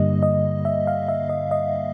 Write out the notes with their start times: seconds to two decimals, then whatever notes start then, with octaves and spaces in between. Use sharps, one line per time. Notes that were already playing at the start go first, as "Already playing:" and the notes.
Already playing: G2 D3 G3 A#3 D#5
0.23 D#5
0.65 E5
0.87 F5
1.08 E5
1.29 D#5
1.51 D#5